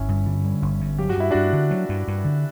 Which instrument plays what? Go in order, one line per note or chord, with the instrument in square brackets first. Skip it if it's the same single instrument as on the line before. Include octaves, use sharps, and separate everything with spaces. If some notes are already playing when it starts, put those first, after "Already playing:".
Already playing: [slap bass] G1 [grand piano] C#4 E4
[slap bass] G2
D3
G3
G1
G2
[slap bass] F#3 [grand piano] G4
[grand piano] F#4
[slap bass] G2 [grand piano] E4
[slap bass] G2 [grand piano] D4 F#4
[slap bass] D3
F#3
G2
G2
D3